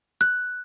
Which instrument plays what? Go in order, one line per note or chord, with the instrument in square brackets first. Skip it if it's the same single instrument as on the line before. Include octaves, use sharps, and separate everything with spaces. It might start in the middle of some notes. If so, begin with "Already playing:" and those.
[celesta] F#6